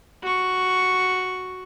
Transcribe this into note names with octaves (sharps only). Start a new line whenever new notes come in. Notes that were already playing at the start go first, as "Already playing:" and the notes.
F#4 C#6